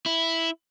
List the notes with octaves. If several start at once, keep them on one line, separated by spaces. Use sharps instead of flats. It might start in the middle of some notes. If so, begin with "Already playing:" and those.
E4